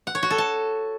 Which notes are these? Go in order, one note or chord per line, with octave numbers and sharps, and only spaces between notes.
F#5
C#5
F#4
A4
A5